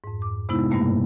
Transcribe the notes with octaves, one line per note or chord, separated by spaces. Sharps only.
F2 G#2
D6
C3 G#3 B3 D#4 E4
G2 B2 G3 A3 A#3